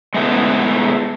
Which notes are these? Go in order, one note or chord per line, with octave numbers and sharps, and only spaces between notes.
G#3 A3 B3 E4